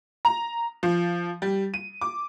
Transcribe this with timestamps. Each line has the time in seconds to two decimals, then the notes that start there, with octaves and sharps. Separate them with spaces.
0.25 A#5
0.83 F3
1.42 G3
1.74 D#7
2.01 D6